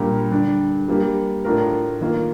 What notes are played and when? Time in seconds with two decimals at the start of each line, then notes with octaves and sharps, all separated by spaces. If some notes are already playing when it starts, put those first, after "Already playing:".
Already playing: A#2 G3 D4 G4 A#4
0.31 D3 G3 D4
0.88 G3 A#3 D4 G4
1.45 A2 A3 D4 F4 A#4
2.01 D#3 A#3 F4